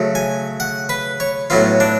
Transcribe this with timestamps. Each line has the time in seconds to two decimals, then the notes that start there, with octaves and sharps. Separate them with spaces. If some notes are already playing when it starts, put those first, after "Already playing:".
Already playing: C#3 F#3 A3
0.15 G#5
0.60 F#5
0.89 B4
1.20 C#5
1.50 A2 F#3 B3 F4
1.80 D4